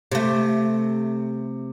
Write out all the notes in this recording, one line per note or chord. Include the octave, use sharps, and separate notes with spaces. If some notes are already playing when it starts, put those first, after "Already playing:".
C3 A3